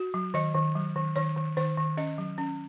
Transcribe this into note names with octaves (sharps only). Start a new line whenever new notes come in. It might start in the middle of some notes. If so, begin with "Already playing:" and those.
Already playing: F#4
F#3
D#3 D#5
D#3
F#3
D#3
D#3 C#5
D#3
D#3 C5
D#3
C#4 D#5
F#3
C#4